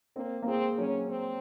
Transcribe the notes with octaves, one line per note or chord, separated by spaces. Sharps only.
A#3 C4
A#3
G#3 C4
F#3 C#4
C4